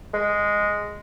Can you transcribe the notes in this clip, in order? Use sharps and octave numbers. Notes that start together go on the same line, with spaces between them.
G#3